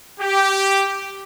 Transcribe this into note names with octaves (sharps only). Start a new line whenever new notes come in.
G4